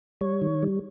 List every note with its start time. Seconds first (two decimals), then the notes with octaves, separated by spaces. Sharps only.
0.21 G3 C#5
0.41 D#3
0.63 G3